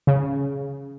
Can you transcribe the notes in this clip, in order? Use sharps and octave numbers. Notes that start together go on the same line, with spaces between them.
C#3